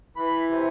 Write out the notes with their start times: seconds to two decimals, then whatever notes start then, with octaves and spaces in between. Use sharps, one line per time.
0.16 E3 B5
0.49 C3